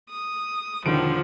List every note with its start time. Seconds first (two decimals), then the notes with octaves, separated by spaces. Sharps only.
0.10 D#6
0.86 E1 D3 D#3 F3 D7